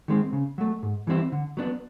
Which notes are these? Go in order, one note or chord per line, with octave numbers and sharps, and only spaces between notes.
D#3 G#3 C4
C#3
F#3 A3
G#2
E3 G3 C4 E4
D3
F#3 B3 D4